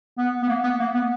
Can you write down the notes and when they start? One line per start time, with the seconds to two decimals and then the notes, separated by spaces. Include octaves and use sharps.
0.18 B3
0.42 B3
0.48 A#3
0.63 B3
0.80 A#3
0.94 B3